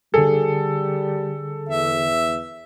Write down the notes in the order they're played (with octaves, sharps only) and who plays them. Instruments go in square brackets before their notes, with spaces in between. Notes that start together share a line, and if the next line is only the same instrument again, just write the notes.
[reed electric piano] D3 G#4 [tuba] G3 [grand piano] A4
[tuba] E2 [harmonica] E5